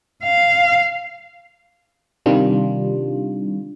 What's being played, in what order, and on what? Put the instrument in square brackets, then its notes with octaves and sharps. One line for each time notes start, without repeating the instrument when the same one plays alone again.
[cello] F5
[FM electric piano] C3 D#3 G3 D4 F4